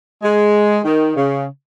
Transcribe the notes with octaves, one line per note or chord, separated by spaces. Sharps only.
G#3
D#3
C#3